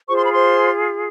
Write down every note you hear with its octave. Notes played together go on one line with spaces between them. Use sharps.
F4 G#4 C5 C#6
C6
B5
C5 C6